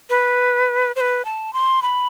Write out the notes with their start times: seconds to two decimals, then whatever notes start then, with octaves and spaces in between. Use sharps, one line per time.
0.10 B4
0.96 C5
1.00 B4
1.25 A5
1.53 C6
1.82 B5